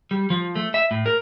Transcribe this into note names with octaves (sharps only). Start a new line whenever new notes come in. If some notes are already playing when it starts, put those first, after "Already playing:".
G3
F3
A3
E5
A2
A#4